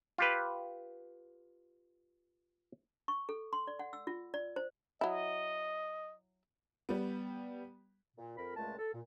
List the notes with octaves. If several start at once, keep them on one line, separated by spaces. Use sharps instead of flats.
F4 G4 B4
C#6
A4
C6
D5
F#5
E6
F4
D5
C5
F#3 E4 D#5
G3 B3
A#2
F2 A#4 B5
C#2 A#2 G#3 A3 A5
A4
A#2